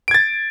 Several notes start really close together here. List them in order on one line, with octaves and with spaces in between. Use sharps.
D7 G#6 A6